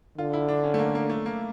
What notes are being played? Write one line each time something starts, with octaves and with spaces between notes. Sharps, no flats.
D3 F4
E4
D4
C#4
A3
A#3
A#3
A3
A#3